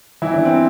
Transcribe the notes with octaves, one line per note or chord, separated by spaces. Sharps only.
E3 E4
D4
C4